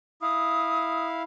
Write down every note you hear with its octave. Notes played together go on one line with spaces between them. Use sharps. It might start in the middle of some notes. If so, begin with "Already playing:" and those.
E4 F5 D#6